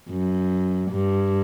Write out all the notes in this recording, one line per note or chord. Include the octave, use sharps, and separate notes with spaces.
F#2
G2